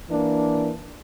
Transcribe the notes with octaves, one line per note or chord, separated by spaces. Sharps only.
E3 A#3 D4